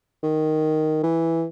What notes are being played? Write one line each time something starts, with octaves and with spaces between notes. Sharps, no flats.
D#3
E3